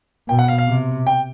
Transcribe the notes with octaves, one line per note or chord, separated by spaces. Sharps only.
B2 G5
F#5
F5
F5
C3
G5